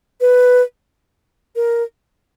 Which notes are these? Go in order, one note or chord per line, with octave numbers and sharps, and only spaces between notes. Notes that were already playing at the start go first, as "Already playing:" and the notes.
B4
A#4